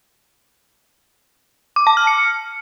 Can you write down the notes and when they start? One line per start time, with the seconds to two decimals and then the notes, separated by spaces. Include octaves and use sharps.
1.76 D6
1.87 A5
1.97 F6
2.07 C#7